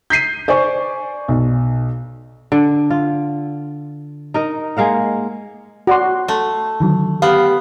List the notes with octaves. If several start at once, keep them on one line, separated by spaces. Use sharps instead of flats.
G6 B6 C7 D#7
C5 D5 G#5 C#6
B1
D3
F4
D#4 A#4 D#5
G#3 A#3 F5 F#5
F#4 D5 C6
A3
D3 D#3 F#3
B3 G4 F5